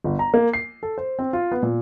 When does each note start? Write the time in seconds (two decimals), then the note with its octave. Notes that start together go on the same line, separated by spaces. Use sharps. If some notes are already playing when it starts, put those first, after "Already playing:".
0.04 G1
0.19 A#5
0.34 A#3
0.53 C7
0.83 A4
0.98 C5
1.19 C4
1.33 F4
1.51 B3
1.63 A#2